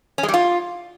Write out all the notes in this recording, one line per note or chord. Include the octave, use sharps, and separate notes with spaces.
C#4
G#3
G3
F4